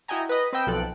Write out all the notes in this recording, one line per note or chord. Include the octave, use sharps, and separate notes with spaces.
E4 F#4 D#5 G5 G#5 A#5
B4 D#5
C4 B4 D#5 G5 E6
B1 F3 A4 F#6 D7